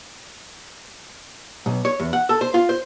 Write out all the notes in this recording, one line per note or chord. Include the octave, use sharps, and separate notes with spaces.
B1
C#5
E2
F#5
A4
C5
F4
C5